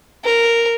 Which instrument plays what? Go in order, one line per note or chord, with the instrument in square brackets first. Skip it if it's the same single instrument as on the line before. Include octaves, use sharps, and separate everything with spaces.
[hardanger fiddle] A#4